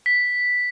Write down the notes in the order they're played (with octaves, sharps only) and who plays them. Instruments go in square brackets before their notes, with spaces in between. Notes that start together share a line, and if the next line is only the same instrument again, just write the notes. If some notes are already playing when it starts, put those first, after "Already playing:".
[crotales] B6